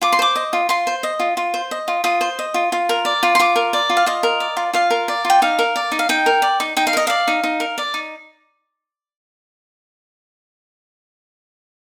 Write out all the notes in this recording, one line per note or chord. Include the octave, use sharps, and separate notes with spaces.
F4 D6
C6
C5 D6
D#5
F4
F4 C6
C5
D#5
F4
F4
C5
D#5
F4
F4 D#6
C5
D#5
F4
F4
A#4
D5
F4
C6
F4 D6
A#4
D5
F4
F5
F4 D#5
A#4
D5
F4
F4 F5
A#4
D5
F4
G5
D#4 F5
A#4
D5
D#4
F5
D#4 G5
A#4
D5
D#4
D#4 G5
F5
A#4 D#5
D5 F5
D#4
D#4
A#4
D5
D#4